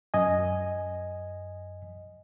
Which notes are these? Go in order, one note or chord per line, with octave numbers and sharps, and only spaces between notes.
F#2 D#5 G#5